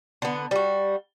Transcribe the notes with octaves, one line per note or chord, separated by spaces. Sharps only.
D3 B3
G3 F#4